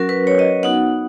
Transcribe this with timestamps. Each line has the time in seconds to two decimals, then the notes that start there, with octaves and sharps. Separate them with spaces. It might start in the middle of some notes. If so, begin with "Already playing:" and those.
Already playing: F#3 C#4 F#4 A#4
0.09 B4
0.27 C#5
0.39 D#5
0.63 B3 D#4 F#4 F#5